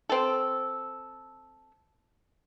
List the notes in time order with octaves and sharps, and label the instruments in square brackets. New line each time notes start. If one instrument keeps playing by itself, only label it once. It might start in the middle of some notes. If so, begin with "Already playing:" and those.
[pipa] C4 A4